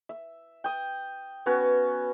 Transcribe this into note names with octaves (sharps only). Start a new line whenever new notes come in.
E5
G5 D#6
B3 C#4 F#4 B4